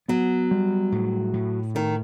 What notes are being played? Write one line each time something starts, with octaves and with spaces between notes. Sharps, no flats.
F#3 B3
G3
A2
A2
D#3 A3